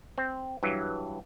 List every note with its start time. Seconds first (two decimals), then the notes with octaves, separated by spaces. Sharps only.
0.18 C4
0.63 G2 E3 F#3